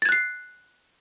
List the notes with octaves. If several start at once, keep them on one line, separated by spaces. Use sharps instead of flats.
F#6 G#6 A6 C7